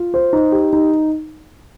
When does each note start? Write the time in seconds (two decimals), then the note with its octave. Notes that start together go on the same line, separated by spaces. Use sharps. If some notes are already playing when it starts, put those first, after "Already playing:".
Already playing: F4
0.14 C5
0.33 D#4
0.52 G4
0.73 D#4